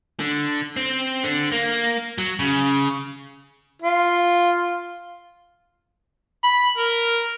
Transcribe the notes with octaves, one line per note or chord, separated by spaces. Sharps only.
D3
C4
D3
A#3
F#3
C#3
F4
B5
A#4